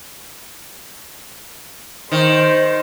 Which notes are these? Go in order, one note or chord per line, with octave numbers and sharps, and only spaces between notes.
D#3 C5